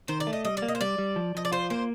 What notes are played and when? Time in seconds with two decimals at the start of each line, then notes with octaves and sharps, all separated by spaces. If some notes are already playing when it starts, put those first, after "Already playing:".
0.08 D#3 C5
0.20 D5
0.27 A3
0.33 D#5
0.45 G3 D#5
0.57 D5
0.62 A#3
0.68 D#5
0.75 C5
0.81 G3 D5
0.98 G3
1.16 F3
1.35 F3 D#5
1.45 D5
1.52 F4 C5
1.70 A#3 C5